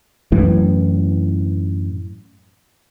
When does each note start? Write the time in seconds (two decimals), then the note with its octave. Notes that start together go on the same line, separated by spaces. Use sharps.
0.32 F#2 A2 E3